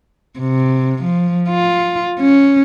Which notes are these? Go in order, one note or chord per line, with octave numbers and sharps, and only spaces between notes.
C3
F3
F4
C#4